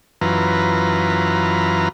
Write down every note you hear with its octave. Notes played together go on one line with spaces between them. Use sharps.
F#2 E3 F4 B4 A#5